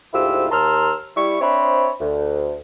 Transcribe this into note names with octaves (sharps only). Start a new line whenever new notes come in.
D2 G#2 E4 F4 G4 E6
D#2 A5 A#5 C6 E6 F6
G3 E4 C#6
C4 D4 C5 C#5 E5 B5
D2